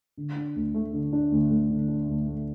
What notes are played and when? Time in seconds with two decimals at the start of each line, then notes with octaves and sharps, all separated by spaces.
0.17 D3
0.36 D4
0.56 D2
0.74 A3
0.93 D3
1.13 D4
1.32 D2
1.51 A3
1.70 D3
1.88 D4
2.08 D2
2.27 A3